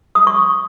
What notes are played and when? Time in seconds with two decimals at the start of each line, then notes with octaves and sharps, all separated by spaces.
0.15 D#6
0.27 C#6